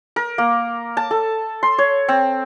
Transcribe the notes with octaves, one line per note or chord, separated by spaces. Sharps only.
A#4
A#3
A5
A4
C6
C#5
C4